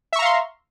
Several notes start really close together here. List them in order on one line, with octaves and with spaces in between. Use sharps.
E5 C#6 A#5 F5 C6